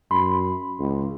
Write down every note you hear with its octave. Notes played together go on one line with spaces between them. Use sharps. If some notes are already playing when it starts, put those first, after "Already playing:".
F#2 B5 C6
C#2